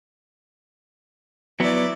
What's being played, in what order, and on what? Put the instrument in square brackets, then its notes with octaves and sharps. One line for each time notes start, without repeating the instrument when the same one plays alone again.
[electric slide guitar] F#3 B3 [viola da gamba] E4 D5